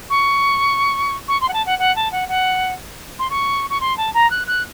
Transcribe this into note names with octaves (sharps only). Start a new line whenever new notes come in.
C#6
C#6
C6
F#5
A5
F#5
F#5
A5
F#5
F#5
C6
C#6
C#6
C6
A5
A#5
F#6
F#6